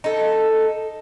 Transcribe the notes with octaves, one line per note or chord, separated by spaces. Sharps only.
D#4 A4